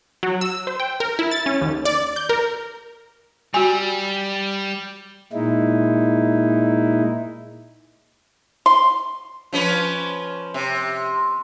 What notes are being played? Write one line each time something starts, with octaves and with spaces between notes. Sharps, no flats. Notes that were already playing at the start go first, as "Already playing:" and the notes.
F#3
E6
C5
G5
A#4
E4
A6
C#4
D#2
D5
G6
A#4
G3 F#4 G#5
A#2 G#3 D#4 E4
C6
F3 C#4 B4
C3